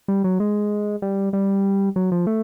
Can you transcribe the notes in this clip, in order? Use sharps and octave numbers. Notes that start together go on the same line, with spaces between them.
G3
F#3
G#3
G3
G3
F#3
F3
A3